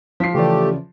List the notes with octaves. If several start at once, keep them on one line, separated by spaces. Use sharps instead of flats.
F3 B6 C7
C#3 E3 A3 G4 D5